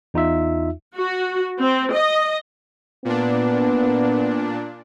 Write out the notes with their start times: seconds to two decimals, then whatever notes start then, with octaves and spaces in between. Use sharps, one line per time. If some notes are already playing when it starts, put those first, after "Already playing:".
0.14 E2 D#4 F4 E5
0.96 F#4
1.59 C4
1.93 D#5
3.05 A#2 B3 D4